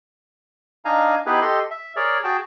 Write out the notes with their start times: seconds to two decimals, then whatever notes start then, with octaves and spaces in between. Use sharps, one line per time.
0.85 D4 D#4 F5 G#5 A#5
1.26 B3 D#4 E4 G4 G#4 B4
1.42 G4 A4 D#5 C6
1.71 E5
1.96 G#4 A#4 C#5 D5
2.24 F#4 G#4 G5 A5